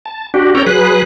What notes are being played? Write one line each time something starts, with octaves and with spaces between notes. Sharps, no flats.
A5
D4 F#4 G4
C#4 A4 C#5 G5 A#5
F#3 G#4 B4 F#6